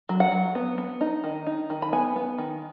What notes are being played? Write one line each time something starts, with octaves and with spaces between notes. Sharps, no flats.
F#3
F#5
F#3
B3
B3
D#4
D#3
D#4
D#3
B5
B3 G#5
B3
D#3